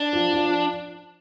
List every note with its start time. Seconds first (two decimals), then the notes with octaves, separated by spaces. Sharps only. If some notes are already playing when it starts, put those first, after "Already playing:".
Already playing: D4
0.13 F3
0.33 F3